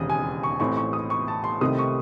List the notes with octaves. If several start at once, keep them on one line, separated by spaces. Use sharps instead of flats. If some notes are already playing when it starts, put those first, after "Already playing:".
Already playing: E1 D#2 C#3 E3 C4 D#6
G#5
C#6
A1 A2 E3 C4 C#6
C#6
D#6
C#6
A5
C6
C2 C3 D#3 A3 C4 D#6
C#6